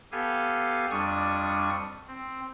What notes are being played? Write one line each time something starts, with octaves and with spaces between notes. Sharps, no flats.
B3 G4 A4 F5 G#5
F2 G3 D4 C#6 D#6
C4